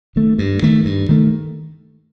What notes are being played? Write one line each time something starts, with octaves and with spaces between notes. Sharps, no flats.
D#3 A3
G2
D#3 A3
G2
D#3 A3